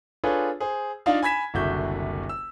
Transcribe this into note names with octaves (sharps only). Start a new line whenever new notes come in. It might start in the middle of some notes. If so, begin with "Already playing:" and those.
D4 F4 G#4 A4 B4 C#5
G#4 C5
D4 D#4 F4 D5 F5
G#5 B5 G#6 B6 E7
F#1 C2 D3 F#4 E5 G6
E6